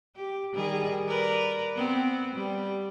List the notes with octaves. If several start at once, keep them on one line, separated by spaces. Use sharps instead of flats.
G4
D#3 G3 G#4
A#4 B4 D5
B3 C4
G3